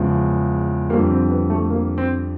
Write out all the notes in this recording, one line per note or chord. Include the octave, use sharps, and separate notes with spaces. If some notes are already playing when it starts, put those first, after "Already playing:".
Already playing: E2 C#3 F3 G#3
F2 D3 G3 A#3
C4
B3
A3
A#3
C4